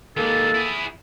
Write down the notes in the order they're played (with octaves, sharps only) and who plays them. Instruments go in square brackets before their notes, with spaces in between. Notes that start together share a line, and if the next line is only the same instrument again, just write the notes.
[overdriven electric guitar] D#2 G#3 [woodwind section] A#3 A4
[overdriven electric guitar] E4 G#4